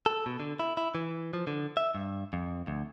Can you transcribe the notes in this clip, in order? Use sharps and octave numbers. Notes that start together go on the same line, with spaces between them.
A4
B2
D3
E4
E4
E3
F3
D3
E5
G2
F2
D2